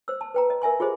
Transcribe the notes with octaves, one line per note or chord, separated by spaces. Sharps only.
C5 E6
A5
B4 G5 A#5
D#5
A#4 E5 G#5 C6
F4 G4 G#4 C5 D#5